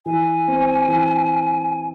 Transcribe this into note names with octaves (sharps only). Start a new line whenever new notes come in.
E3 G#5
C4
E3